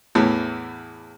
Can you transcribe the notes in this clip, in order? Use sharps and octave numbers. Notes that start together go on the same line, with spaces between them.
E2 A2 E3